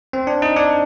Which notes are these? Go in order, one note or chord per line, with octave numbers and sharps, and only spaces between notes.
C4
D4
D#4
D4